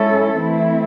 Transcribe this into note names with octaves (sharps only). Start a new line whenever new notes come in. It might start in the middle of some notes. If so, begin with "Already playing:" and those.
Already playing: G#2 F#3 C#4 E4 A4
E3 A3 C4 E4